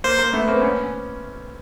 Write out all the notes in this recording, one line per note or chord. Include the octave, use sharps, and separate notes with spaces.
A#3 C5
A#3
A3 B3
A#3 C4
B3 C#4